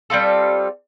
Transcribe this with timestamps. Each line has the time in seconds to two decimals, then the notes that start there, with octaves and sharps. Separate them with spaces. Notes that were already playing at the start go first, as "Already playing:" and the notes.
0.10 G3 C4 F4 A4